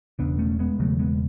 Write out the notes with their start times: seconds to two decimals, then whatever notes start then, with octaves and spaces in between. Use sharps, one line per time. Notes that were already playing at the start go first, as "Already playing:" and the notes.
0.19 E1 E2 C#3 B3 D4
0.39 A3 C#4
0.59 G#3 B3
0.79 E1 E2 C#3 F#3 A3
0.99 G#3 B3